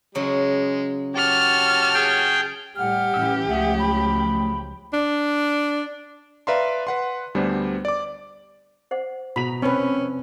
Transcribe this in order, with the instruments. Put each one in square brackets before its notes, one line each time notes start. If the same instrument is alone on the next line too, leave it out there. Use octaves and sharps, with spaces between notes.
[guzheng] C#3 F#3 [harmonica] G#3
[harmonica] F#4 G4 C#5 [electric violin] A5 F6
[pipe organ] G#4 G5
[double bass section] A2 G3 [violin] G4 [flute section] F#5 F6
[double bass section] A2 E3 [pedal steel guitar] C#4 E6
[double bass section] C#2 F3 F#3 [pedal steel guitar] A3 G#4 [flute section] E5 F#5
[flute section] G5 B5
[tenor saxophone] D4
[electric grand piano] B4 D5 E5 F5 A#5 C6
B4 F#5 C6
D2 G3 B3 D4 C5
D5 D6
[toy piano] C5 F#5
[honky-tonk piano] B2 A#5 F7 [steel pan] B5
[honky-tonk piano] F1 [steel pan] C4 B4 [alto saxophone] C#4 [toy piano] D#4